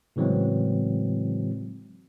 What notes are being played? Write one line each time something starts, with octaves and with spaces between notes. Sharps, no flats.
A2 C#3 E3 F#3 G#3 C4